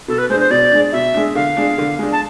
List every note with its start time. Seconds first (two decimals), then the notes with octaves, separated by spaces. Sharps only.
0.08 B2 A4
0.18 B4
0.30 G#3 D4 C5
0.40 C5
0.51 B2 D5
0.72 G#3 D4
0.92 B2 E5
1.14 G#3 D4
1.35 D3 F5
1.57 G#3 D4
1.78 D3
1.99 G#3 D4
2.12 A5